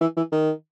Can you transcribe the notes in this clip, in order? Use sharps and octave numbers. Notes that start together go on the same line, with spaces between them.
E3
E3
D#3